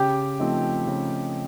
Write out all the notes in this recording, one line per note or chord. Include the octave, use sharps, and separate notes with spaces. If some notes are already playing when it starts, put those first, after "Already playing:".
Already playing: C#3 G4 G5
F3 A3 C4 D#4
C#3